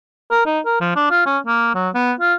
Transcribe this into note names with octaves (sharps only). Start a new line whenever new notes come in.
A#4
D#4
A#4
F3
D4
F4
C#4
A#3
F#3
B3
F4